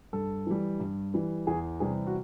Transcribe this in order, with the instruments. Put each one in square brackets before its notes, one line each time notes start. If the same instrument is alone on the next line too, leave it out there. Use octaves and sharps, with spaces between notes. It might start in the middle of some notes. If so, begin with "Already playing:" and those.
[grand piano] G2 A4
E3 G3
G2
E3 G3
E2 G#4
C3 E3 G3 G#4
F#4